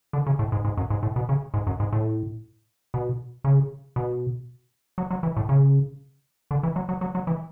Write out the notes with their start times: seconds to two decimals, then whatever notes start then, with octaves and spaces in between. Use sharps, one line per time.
0.13 D3
0.26 C#3
0.39 A2
0.52 G#2
0.65 G#2
0.77 F#2
0.90 G#2
1.03 A2
1.16 B2
1.29 C#3
1.54 G#2
1.67 F#2
1.80 G#2
1.92 A2
2.94 B2
3.44 C#3
3.96 B2
4.98 F#3
5.11 F#3
5.23 E3
5.37 A2
5.49 C#3
6.51 D3
6.63 E3
6.76 F#3
6.89 F#3
7.01 F#3
7.15 F#3
7.27 E3